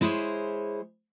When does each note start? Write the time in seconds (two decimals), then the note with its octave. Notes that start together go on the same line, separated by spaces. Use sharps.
0.01 G#3 E4 G#4 C5 C#5